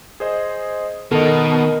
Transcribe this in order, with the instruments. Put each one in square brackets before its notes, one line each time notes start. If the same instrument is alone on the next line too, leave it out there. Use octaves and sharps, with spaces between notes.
[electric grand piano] G#4 C5 D#5
[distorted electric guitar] B2 [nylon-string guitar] D#3 A4 [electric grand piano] A#4 D#5